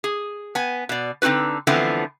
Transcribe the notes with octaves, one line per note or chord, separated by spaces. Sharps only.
G#4
B3 G#5
B2 D5
D3 C4 D#4 F#4 B4
D3 E3 F3 A3 B3 C4